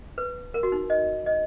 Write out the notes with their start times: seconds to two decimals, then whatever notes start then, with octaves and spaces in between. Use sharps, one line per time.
0.18 B4
0.54 A#4
0.63 F#4
0.72 D#4
0.90 D#5
1.26 D#5